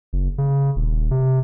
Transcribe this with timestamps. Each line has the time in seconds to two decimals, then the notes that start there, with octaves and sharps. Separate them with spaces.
0.13 F#1
0.38 C#3
0.76 D#1
1.11 C3